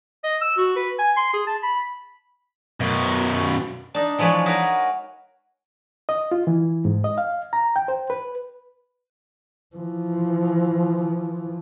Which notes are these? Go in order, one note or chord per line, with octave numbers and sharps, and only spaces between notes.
D#5
E6
F#4
B4
G#5
C6
G#4
A5
B5
F#2 B2
D4 D#4
E3 F3 G#3 B4 C#5 D5
D#4 F#4 G#4 A#4 B4 C#5
D#5
F4
E3
G#2
D#5
F5
A#5
G5
C5
B4
E3 F3